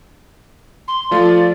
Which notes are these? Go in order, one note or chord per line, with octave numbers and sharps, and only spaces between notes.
C6
F3 A3 F4 D5